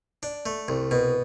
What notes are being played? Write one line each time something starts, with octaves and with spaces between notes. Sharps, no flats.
D4
A3
C2
B2